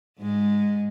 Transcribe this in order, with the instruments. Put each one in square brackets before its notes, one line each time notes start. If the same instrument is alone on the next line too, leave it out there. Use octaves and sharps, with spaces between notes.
[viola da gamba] G#2 G#3